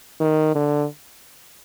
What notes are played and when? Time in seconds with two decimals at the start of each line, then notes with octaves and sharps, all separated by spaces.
0.20 D#3
0.55 D3